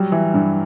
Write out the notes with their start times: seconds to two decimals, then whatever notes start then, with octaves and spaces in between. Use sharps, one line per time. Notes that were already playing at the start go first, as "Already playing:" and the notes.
Already playing: F#3 G3
0.12 E3
0.34 G2